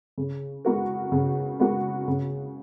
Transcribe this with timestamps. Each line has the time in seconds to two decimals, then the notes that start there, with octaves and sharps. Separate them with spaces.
0.18 C#3
0.65 G#3 B3 F#4 A#4
1.12 C#3
1.59 G#3 B3 F#4 A#4
2.08 C#3